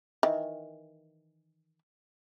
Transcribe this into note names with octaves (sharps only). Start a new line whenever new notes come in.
D#3 E3